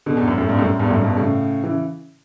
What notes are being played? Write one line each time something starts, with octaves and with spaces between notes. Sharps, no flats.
B2 D3
E2
F#2
F#2 A2
G2 B2
F#2 A2
E2 G2
F#2 A2
G2 B2
A2 C#3
C#3 E3